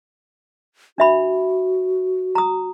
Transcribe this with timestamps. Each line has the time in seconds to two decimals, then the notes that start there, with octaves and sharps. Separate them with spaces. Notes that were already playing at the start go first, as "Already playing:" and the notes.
0.98 D4 F#4 E5 B5
2.35 A#5 D#6